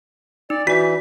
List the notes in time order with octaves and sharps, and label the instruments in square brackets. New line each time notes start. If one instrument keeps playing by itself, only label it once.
[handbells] D#4 [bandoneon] D5
[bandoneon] E3 [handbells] F#4 D5 [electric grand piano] B6